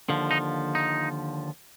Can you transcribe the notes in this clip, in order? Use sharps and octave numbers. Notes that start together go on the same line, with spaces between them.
D#2 D3 F3
D#4
D#4